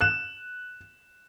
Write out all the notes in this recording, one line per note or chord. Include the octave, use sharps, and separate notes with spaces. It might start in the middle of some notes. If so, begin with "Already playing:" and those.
F#6 E7